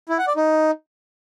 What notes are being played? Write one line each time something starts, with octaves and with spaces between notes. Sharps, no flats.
E4
F#5
D5
D#4